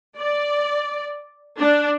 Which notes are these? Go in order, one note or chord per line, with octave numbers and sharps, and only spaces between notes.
D5
D4